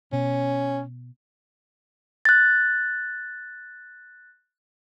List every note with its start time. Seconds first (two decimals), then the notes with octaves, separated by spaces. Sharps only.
0.13 B2 C#4
2.25 F#6 A6